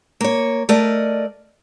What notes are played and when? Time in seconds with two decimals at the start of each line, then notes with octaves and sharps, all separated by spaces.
0.21 A#3 C#5
0.69 A3 A#4 D5 D#5